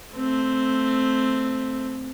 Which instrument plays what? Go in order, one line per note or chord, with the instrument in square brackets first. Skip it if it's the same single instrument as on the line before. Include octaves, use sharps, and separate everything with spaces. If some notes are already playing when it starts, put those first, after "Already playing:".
[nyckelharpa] A3 C4